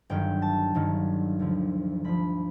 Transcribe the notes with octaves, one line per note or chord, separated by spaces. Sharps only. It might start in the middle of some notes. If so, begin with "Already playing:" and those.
G1 G2 D#3 F#3 G5
A5
G1 G2 D#3 F#3
D2 D3 F3
D2 D3 F3 B5